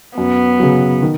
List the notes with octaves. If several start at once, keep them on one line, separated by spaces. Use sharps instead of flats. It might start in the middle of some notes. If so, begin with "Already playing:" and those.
F#2 B3
C#3 F#3
D#3